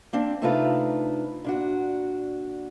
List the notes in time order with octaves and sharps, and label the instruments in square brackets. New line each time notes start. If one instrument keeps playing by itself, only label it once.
[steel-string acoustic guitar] A#3 C4 D4
C3 A3 D4 D#4 F4 B4
A#2 D4 F#4